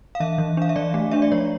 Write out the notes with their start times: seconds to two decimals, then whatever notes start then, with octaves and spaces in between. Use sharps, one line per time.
0.15 F5
0.20 E3 E5
0.38 E3
0.57 D4 F5
0.69 E5
0.76 E3 D5
0.94 A3
1.11 D4 E5
1.22 D5
1.32 F3 C#5